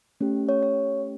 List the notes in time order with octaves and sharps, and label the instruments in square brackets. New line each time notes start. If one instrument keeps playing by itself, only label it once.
[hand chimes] A3 C#4 G4
C#5
C#5